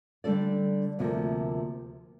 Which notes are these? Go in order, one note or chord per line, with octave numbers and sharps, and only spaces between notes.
D3 G3 D4 A4 D5
D2 C3 F3 A#3